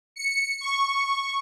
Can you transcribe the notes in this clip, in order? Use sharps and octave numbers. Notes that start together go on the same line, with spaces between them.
C#7
C#6